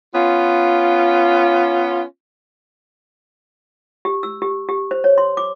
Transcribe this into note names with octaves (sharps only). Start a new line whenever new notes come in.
B3 C#4 F4
G4
E6
G4
G4
C5
C#5
C6
D6